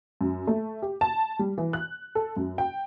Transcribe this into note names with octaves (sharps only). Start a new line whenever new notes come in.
F#2
A3
G4
A5
G3
E3
F#6
A4
F#2
G5